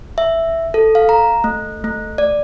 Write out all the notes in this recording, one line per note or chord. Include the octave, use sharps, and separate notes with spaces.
E5
A4
F5
A#5
A3
A3
D5